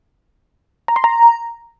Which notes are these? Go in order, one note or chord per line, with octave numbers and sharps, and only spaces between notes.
A#5
C6
A#5